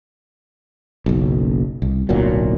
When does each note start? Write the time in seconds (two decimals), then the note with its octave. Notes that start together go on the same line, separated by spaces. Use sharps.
1.06 F#1 B1
1.82 C2
2.09 D1 B1 A#2 F#3